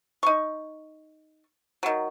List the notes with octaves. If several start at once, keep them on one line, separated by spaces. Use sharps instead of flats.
D#4 C#6
D#3 F#3